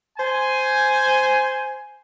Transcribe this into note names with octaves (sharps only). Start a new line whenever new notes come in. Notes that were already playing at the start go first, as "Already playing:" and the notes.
C5 G#5